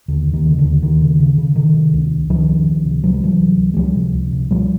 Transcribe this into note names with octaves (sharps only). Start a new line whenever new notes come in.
D#2 D3
D#2
D#3
C#3
D3
D#2
D#2 D#3
C#3
C#3
C#3
C3 D#3
C3
C#2
C#2
C#2 D#3 F3
C#2
C#2
C3
C3 F#3
G3
C3 E3 F#3
C#2
C#2
G#3
C#2 F3 G3
C3
C#2
C3
B2 F3 G3